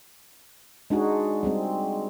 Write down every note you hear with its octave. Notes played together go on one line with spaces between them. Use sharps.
G#3 D4 D#4 F#4 G#4
G3 G#3 C4